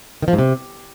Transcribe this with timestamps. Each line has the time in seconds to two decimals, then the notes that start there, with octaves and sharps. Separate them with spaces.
0.22 D#3
0.28 F3
0.33 G#2
0.39 C3